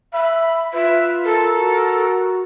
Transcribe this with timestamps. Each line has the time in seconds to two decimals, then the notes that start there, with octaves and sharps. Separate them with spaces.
0.13 E5 B5
0.73 F4 B4 E5
1.25 A4 A#4
1.56 F#4